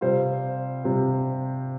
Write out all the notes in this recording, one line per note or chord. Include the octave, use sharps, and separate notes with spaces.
C3 G3 C4 F4 C5
C3 G3 C4 F4